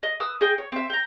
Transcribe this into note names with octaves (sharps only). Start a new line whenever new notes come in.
D#5
B4 D#6 E6
G#4 D#5 G5
C#5
C4 E5
G5 A#5